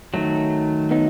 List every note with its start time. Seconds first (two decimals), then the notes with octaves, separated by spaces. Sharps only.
0.14 D#3 F#3 A3
0.91 B3 D#4